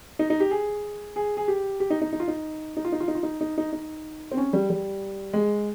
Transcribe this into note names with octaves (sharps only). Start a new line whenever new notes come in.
D#4
D#4
G4
G#4
G#4
G#4
G4
G4
D#4
D#4
D#4
F4
D#4
D#4
F4
D#4
F4
D#4
F4
D#4
D#4
D#4
D#4
C4
C#4
G3
G3
G#3